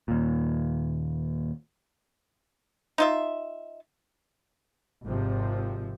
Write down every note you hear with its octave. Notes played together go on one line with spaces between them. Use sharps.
D#2 A#2
D#4 F4 E5
G#1 C3 F3